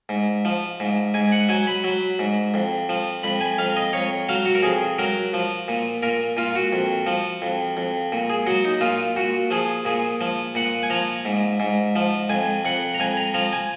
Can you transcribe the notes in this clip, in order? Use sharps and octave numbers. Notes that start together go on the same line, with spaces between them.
G#2
F3
G#2
G#2 G#5
F#5
F#3 G#5
B5
F#3
G#2
F2
F3
F2 B5
G#5
F2 F5
D#5
F2 C#5
F#3 F5
F#4
A#4
F2 G#4
F#3 A#4
F3
A#2
A#2 A#4
A#2 F4
F#4
F2
F3
F2
F2
A#2
G#4
F#3 F#4
D#4
A#2 F4
A#2 F#4
F3 G#4
A#2 G#4
F3
A#2 F#5
G#5
F3 A#5
G#2
G#2
F3
F2 G#5
F2 F#5
A#5
F2 G#5
A#5
F3 A#5
G#5